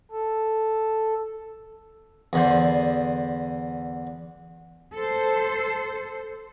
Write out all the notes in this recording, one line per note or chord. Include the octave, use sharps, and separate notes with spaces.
A4
E2 D3 C5
A4 C5